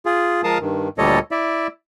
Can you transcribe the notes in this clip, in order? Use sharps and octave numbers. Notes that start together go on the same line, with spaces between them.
F4 G#4
F3 G#3 A#4 F5 A5 D#6
G2 D#3
D2 A#2 G3 A4 C#5 D#5
E4 D5 E5